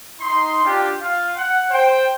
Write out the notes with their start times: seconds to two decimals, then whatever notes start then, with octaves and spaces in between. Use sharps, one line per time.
0.19 D#4 C6
0.63 D4 F4 G4 G5
1.01 F4 F5
1.36 F#5
1.70 C5 G5